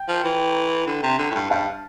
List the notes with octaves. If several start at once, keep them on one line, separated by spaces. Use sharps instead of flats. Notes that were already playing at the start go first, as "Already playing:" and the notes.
Already playing: G5
F3
E3
D3
C3
D3
A2
G2
G2 F5 A5